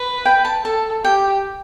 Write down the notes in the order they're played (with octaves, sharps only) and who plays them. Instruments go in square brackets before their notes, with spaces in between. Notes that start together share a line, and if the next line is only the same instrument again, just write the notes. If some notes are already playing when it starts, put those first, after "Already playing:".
Already playing: [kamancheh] B4
[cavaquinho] G5
A5
[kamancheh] A4 [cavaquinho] A5
[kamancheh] G4 [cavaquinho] G5